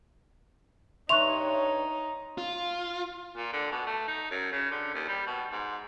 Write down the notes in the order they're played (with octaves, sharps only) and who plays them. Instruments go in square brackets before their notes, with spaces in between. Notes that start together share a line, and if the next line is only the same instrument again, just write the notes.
[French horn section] G2 C#5 [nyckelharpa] D#4 [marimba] E5 C#6 F#6 [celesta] C6 F7
[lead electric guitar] F4
[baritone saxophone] A#2
D3
B2
A3
D#4
F#2
C#3
D3
D#2
G3
B2
G#2